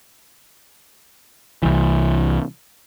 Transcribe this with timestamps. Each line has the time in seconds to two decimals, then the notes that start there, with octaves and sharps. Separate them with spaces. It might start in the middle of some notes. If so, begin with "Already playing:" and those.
1.63 C2 E3